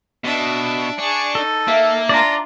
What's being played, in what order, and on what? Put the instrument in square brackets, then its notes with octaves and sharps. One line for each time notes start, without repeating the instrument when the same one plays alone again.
[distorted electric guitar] B2 [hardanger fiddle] D4 E5
[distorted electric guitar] D4 [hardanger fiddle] G#4 C#6
[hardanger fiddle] D#4 [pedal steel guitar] A4
[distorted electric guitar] A#3 [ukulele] E5
[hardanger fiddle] D4 F4 [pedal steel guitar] D5 A#5